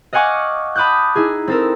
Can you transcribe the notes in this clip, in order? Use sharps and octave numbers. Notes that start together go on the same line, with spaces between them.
D#5 F5 F#5 G#5 C#6 D6
A5 B5 D6 D#6 F#6 G6
D#4 E4 G#4
C4 A4 A#4